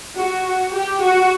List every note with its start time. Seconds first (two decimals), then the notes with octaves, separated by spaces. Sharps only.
0.16 F#4
0.74 G4
1.02 F#4